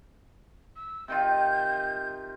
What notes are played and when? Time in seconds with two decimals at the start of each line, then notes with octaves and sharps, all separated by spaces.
0.76 E6
1.08 C3 D#3 F4 G6